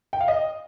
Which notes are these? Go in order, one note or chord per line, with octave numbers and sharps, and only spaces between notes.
G5
F5
D#5